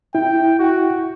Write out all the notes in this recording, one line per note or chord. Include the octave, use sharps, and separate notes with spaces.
E4 G5
F#4